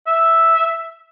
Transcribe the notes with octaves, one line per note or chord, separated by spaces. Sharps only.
E5